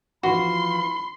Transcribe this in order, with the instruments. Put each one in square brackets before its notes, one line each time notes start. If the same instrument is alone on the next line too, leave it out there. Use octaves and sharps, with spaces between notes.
[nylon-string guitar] E3 F3 [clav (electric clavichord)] F#4 [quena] B5 [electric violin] C6